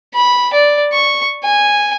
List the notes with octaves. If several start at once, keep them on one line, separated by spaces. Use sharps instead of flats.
B5
D5
C#6
G#5